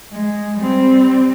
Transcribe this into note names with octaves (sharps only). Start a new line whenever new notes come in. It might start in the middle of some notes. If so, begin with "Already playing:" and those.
G#3
G3 C4